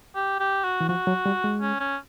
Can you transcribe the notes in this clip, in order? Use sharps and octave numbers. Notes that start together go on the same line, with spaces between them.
G4
G4
F#4
E3
F3 F#4
F#3
G3
G#3
C#4
C#4